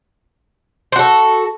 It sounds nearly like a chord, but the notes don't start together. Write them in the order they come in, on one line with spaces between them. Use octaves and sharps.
C5 F#4 A4